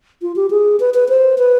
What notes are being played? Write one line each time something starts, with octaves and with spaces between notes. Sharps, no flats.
F4
G4
G#4
B4
B4
C5
B4